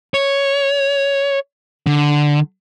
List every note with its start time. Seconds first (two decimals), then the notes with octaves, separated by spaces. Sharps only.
0.14 C#5
1.87 D3